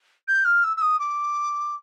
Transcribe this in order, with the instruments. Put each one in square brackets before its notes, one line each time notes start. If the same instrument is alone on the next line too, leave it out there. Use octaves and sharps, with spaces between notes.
[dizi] G6
F6
E6
E6
D#6
D6